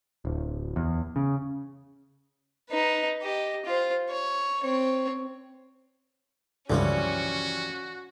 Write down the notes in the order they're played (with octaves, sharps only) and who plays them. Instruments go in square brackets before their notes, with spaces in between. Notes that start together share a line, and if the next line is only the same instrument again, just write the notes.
[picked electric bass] D1
E2
C#3
[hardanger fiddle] D#4 B4
G4 D#5
F4 C5
C#5
C4 C#5
[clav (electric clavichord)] C#2 G2 D3 [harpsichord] E3 F3 G3 [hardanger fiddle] C#4 [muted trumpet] F#4